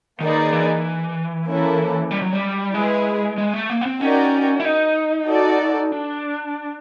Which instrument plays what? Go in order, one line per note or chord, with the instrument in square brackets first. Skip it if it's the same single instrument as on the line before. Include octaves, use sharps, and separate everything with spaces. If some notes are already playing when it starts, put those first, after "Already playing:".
[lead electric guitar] D#3 [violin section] A#3 D#4 G#4 B4 D5
[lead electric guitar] E3
[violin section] A#3 C#4 E4 A4
[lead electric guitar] G3
F#3
G3
[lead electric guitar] G#3 [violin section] E4 G#4 B4
[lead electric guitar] G#3
A3
A#3
B3
C4
[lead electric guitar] C#4 [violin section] D#4 F#4 A#4 D5 G5
[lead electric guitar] E4
D#4
[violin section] F#4 A4 D5
[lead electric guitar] D4